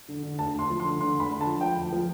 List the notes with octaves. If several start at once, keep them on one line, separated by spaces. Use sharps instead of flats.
D3
D3
D2 A5
D2 C6
F3
D3 C6
D3 C6
D2 B5
D3
F3 A5
F3 G5
D2
F3